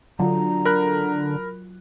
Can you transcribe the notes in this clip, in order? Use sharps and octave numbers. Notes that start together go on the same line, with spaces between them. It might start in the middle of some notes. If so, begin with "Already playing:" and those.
D3 F#3 F4 A#5
A#4 B5 F#6